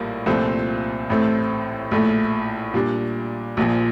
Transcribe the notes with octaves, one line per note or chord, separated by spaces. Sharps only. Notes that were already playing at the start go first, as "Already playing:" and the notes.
Already playing: A#1 A2 G3 A#3
C2 A#2 F3 A3 C4
A1 A2 A3 C4
A#1 A2 A3
A#2 G3 D4
A#1 A#2 F3